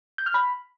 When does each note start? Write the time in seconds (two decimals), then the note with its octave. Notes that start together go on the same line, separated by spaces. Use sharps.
0.18 G6
0.26 F6
0.34 B5